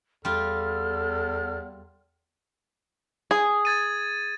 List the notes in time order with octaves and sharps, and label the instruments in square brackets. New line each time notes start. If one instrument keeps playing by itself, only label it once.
[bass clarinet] E2 [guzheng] G3 F4 [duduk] A4 [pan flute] F6
[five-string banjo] G#4
[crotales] G#6 A6 D#7